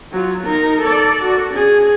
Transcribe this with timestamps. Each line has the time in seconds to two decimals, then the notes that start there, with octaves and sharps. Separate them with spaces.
0.12 F#3 F4
0.44 D#4 A#4
0.82 A4 D5
1.24 F#4
1.54 C#4 G#4